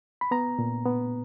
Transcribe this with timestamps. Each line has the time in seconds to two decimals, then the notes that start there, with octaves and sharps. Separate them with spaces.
0.21 B5
0.31 B3 A#5
0.59 A#2
0.85 B3